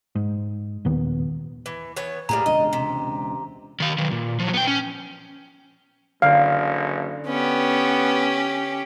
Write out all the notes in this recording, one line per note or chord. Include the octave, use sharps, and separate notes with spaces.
G#2
A#1 D#2 D#3 B3
E3
E3 B3 C#5
A2 G3 A#3 G#4 A#5
E1 C#2 D4 D#5
C3
D#3 F5
D#3 F#3
A#2
F3 F#3
B3 G5
C#4
F#1 D3 F5
B3 C#4 G4